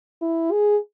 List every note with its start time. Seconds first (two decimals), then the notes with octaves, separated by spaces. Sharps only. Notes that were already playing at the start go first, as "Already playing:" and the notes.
0.22 E4
0.52 G#4